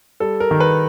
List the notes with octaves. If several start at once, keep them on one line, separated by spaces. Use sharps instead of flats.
G3 A4
A#4
D#3
B4